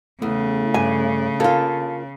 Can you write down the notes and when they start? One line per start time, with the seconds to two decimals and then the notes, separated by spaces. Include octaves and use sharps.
0.22 E2 C#3 A3
0.74 G2 G#5
1.40 A#3 F4 A4